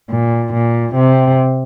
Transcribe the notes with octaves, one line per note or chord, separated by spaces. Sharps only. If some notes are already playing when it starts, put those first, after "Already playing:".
A#2
A#2
C3